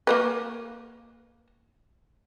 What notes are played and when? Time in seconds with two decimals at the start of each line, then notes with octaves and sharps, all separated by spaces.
0.07 A#3 A#4 B4